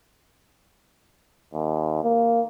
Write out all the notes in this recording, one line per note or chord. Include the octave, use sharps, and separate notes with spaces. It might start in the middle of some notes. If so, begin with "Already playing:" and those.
D#2
A#3